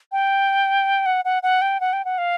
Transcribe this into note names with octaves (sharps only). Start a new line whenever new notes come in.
G5
F#5
F#5
F#5
G5
F#5
G5
F#5
F5